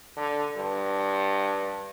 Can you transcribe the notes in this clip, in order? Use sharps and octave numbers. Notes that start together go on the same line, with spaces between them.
D3
G2